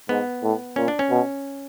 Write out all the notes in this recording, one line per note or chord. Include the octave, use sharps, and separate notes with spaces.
G#2 B3
A2
A#2 C#4
D4
C#4
B2